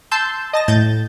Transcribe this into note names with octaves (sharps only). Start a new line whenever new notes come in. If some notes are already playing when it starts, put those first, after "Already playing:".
A5 C6 E6 G6
D#5 A5 A#6
A2 G6 A6